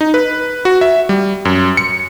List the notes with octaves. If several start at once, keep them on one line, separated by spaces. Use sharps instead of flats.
D#4
B4
F#4
E5
G3
F#2
C#7